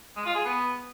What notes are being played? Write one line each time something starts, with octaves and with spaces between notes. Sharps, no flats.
G#3
F4
G#4
B3